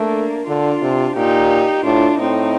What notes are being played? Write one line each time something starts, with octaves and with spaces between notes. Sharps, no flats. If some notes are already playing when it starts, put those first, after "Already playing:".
Already playing: A3 A#3 D4
D3 D4 F4
C3
A#2 D#4 G4
A2 D4 F4
A2 C4 D#4